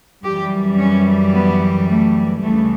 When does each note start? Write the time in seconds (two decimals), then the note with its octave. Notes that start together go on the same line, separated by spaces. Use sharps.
0.24 F#2 E3 G3 G4
0.78 C#4
1.33 B3
1.89 A3
2.43 D2 C#3 E3 G3 A3